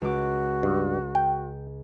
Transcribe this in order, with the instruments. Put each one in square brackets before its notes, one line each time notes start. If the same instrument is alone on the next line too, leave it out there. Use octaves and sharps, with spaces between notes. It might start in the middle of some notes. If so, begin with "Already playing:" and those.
[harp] C#2 D6 [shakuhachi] F#4
[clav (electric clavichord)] G2
G5